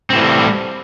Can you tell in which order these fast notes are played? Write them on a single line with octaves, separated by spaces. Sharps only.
C4 A2 E3 G3